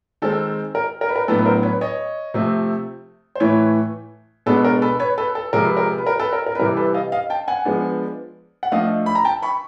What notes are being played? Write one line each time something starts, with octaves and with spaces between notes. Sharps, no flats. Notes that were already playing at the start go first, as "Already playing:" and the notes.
D#3 G#3 C4 A4
A#4
A#4
B4
A#4
A2 F#3 B3 D4 A4 B4
B4
A#4 C5
B4 C#5
C#5 D#5
C3 F3 A3 C4
C5
A2 E3 A3 B4 C#5
B2 G#3 B3 D4 A4 B4
A#4
A4 B4
B4 C#5
A4 B4
A4
C3 F3 G#3 A#4
B4
A#4
B4
A#4
A4 B4
A#4
A#4
B4
C3 E3 G3 A#4
A4 B4
D#5 F5
D#5 F5
G5 A5
F#5 G#5
F3 G#3 B3 D4
F#5
F3 A3 D4 D#5 F5
B5
A#5
G5 A5
B5 C#6